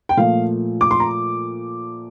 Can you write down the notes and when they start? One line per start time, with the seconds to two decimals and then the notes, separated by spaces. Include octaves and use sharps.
0.09 G5
0.17 A#2 F3 A3 F5
0.81 D6
0.91 C6
1.00 A#5